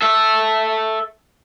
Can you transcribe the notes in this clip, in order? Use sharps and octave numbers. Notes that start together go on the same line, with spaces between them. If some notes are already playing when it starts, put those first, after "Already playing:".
A4 E5